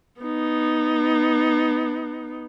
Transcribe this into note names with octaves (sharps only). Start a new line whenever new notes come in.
B3 D#4